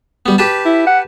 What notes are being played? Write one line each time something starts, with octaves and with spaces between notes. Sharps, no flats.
G3 B3
G4 B4 A5
E4
F#5